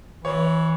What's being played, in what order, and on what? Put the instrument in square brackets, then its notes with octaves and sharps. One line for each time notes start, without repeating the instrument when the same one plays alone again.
[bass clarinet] E3 [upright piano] C#5